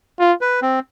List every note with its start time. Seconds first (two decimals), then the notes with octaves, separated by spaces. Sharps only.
0.20 F4
0.41 B4
0.62 C4